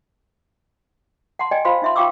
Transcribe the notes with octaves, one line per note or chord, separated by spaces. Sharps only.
F#5 A5 C6
D5 D#5 G5 G#5
F4 C5 F5 B5 C6
D#4 E5 C6
F4 F5 G5 C#6 D6 E6